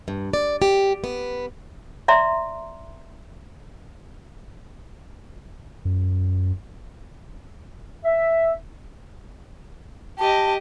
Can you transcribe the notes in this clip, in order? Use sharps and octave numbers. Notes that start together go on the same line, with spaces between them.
G2
D5
G4
B3
D5 E5 A#5 C6
F#2
E5
G4 D#5 A5